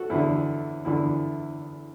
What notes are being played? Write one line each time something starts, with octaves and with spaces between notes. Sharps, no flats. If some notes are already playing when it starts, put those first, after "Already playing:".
Already playing: F#4 A4
E2 D3 E4
E2 D3 E4